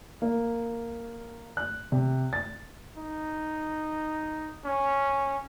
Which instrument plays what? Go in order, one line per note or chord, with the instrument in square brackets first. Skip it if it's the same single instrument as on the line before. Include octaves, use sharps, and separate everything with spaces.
[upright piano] A#3
F#6
C3
A6
[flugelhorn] D#4
C#4